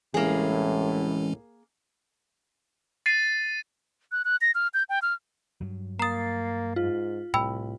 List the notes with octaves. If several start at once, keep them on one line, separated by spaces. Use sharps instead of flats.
C2 A2 E3 G#3 A#3 C#4 G#4
A6 C7 D#7
F#6
F#6
A#6
F6
G6
G5
F6
G2 F#3
A#3 A#5 D#6 A6 C7
G#2 F4
C2 A2 G5 B5 E6